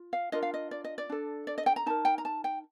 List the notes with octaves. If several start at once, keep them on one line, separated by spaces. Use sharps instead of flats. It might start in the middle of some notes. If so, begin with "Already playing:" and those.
Already playing: F4
F5
D4 F4 A#4 D#5
F5
D#5
D5
D#5
D5
D4 A4
D5
D#5
G5
A#5
D#4 A#4 A5
G5
A#5
A5
G5